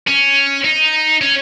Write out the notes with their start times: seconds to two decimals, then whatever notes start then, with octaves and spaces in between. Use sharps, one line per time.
0.07 C#4
0.64 D#4
1.22 C#4